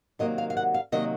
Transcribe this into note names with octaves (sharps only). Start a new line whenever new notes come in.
C3 D#3 F#3 A#3 D#5
F5
F5
F#5
F5
C3 D#3 F#3 A#3 D#5